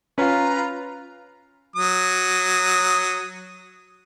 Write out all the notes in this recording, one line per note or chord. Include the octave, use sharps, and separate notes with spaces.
C#4 F4 B4 A#5
F#3 D#6